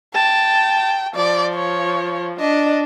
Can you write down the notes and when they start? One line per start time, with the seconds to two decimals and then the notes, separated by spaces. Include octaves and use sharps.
0.14 G5 A5
1.15 F3 D5
1.54 C#5
2.40 D4 D#5